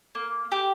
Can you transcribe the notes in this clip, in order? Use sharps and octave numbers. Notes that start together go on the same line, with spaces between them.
A#3
G4